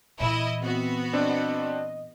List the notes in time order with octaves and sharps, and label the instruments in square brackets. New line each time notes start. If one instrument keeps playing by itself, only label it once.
[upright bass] A#2 E3 [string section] E4 D#5
[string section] B3 F#4 [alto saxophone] C4
[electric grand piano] C4 D4 [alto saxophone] D#5